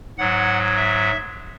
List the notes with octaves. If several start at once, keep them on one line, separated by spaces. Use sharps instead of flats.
G#2 F#3 F#5
E5